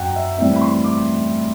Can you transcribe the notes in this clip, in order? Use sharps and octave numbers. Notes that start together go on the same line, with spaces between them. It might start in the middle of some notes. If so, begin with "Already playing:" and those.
Already playing: F#2 F#3 F#5 G5
E5
A2 E3 G3 C4 E5
B5
C6
D6